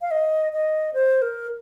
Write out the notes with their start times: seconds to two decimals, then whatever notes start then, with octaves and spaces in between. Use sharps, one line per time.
0.01 F5
0.11 D#5
0.53 D#5
0.94 C5
1.22 A#4